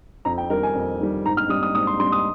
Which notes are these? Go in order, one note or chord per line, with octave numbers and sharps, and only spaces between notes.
F2 A#5
G5
D#3 G3 A#4
G#5
F2
D#3 G3
G#2 A#5
F6
G3 D#6
D#6
G#2 D#6
C6
G3 C6
D#6